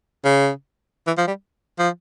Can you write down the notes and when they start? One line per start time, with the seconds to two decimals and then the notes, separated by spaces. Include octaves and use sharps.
0.25 C#3
1.07 E3
1.17 F3
1.27 G3
1.79 F3